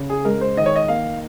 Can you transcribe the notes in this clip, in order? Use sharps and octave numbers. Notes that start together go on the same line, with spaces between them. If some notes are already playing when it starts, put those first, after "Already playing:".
Already playing: C#3
G#4
G#3 A#4
C5
D#3 D#5
C#5
D#5
A#3 F5